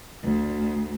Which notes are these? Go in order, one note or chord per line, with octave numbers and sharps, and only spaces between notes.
D2